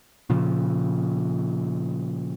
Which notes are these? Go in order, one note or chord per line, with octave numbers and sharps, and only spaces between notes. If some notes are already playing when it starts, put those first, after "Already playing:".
A#2 C#3 F3